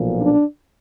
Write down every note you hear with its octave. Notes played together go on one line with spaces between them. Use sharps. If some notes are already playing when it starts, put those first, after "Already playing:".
Already playing: B1 A#2 F3
D4